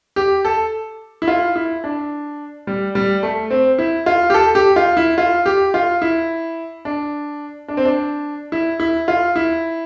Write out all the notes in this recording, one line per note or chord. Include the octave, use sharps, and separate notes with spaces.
G4
A4
E4
F4
E4
D4
G3
G3
A3
C4
E4
F4
G4
A4
G4
F4
E4
F4
G4
F4
E4
D4
D4
C4
D4
E4
E4
F4
E4